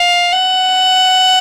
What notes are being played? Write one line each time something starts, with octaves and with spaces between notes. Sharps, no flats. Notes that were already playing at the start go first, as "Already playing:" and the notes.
Already playing: F5
F#5